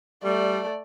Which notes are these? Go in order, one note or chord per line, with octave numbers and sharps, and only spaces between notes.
G3 A3 D5